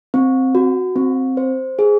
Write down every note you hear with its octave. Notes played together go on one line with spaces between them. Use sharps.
C4
F#4
C4
C5
G#4